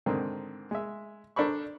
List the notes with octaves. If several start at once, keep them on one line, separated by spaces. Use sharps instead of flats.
G#2 D3 D#3 C4
G#3 E5
D4 A4 A#4 C5 B5 C#6